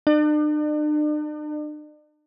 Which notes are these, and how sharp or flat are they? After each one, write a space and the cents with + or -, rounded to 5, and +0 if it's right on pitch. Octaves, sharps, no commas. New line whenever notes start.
D4 +45